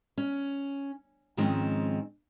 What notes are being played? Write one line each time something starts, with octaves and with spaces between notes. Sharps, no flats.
C#4
G#2 D#3 F3 G#3 C4 C#4